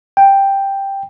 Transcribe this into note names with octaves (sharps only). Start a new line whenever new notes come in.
G5